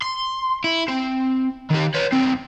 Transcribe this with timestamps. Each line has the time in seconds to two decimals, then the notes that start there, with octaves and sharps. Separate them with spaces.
0.02 C6
0.64 E4
0.88 C4
1.71 D#3 G4
1.95 B4 C#5
2.13 B1 C4